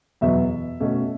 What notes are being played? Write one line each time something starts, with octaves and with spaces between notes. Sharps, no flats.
E2 B2 F#3 B3 E5
B2 A3 C#4